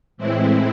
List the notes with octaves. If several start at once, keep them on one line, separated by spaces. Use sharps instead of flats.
A2 E3 G#3 C4 E4